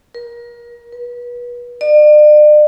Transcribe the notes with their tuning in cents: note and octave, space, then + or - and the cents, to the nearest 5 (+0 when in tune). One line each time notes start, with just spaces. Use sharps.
A#4 +30
B4 -30
D5 +40